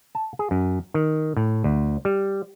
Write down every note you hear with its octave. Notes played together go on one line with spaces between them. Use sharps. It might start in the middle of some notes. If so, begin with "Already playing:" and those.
A5
G#4
F#2
D#3
A2
D2
G3